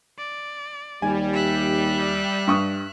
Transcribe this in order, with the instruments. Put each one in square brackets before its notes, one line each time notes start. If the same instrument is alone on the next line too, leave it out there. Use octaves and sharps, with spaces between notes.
[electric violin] D5
[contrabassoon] D#2 [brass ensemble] G3 [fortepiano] G#5
[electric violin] E5 F#6
[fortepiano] G2 C#6 D#6